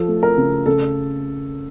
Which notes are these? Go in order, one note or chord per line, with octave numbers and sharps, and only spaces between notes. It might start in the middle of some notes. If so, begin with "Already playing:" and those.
Already playing: F3 A4
A3
A#4
C#3
C#3 A4